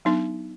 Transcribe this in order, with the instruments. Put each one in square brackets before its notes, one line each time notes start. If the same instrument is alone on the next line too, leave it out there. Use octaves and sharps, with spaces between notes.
[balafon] F#3 B3 D4 D#4